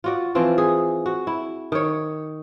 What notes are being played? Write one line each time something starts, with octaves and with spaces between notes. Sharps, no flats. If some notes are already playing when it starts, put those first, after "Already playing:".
F4 F#4 D5
E3 F3 C4 F4
G#4
F#4
E4
D#3 C#5